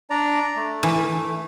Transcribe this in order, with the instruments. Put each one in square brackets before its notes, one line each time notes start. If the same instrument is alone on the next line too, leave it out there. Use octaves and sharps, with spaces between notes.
[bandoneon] D4 D5 A#5
A3
[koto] E3